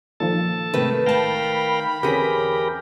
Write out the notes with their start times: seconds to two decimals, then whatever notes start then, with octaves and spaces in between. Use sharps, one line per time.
0.20 A#2 D#3 F3 A4 A5
0.73 G#2 C3 D#3 A3 B4
1.06 A1 A#4 F5 G5 A5 B5
2.03 E2 D3 C4 C#4 G4 G#4 A#4 B6